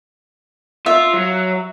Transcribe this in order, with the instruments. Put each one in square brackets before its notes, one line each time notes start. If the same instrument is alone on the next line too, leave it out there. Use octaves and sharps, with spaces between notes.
[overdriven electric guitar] F4 [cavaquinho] E5
[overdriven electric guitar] F#3